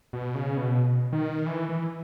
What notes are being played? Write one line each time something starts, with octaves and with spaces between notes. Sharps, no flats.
B2
C#3
B2
D#3
E3
E3